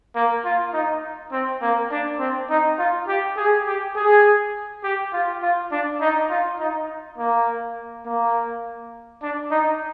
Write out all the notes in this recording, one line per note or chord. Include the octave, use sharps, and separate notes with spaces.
A#3
F4
D#4
C4
A#3
D4
C4
D#4
F4
G4
G#4
G4
G#4
G4
F4
F4
D4
D#4
F4
D#4
A#3
A#3
D4
D#4